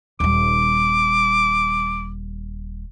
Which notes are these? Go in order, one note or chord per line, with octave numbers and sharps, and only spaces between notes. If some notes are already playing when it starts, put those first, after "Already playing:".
D#1 G3 D6